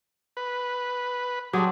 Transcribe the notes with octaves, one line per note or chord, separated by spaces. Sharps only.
B4
F#3 C4 D4 G4 G#4